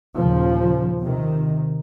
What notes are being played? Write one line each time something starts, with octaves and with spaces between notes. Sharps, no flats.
D#2 A#2 C#3 F3
C3 D#3